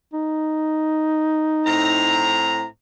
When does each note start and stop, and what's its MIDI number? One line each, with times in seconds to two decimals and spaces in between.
0.13 2.44 63
1.65 2.64 45
1.65 2.64 60
1.65 2.64 82